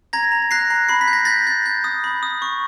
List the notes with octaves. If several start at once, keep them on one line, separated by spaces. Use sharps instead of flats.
A#5 G#6 A#6
A#5
F#6 A#6 C7
A#5
B5 C7
B6
G6
A#6
G6 A6 B6
G6
G6
D#6
B5
D#6
C#6